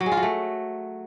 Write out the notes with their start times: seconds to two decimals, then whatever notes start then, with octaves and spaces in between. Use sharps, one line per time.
0.01 F#3
0.06 G#3
0.12 F4
0.17 F#3
0.23 A3